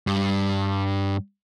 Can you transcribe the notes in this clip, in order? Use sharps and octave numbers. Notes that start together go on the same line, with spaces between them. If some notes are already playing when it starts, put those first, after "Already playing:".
G2